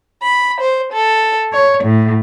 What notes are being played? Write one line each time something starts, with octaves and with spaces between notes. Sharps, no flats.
B5
C5
A4
C#5
A2